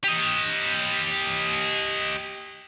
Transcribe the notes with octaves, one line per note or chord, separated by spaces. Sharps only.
G4 D#5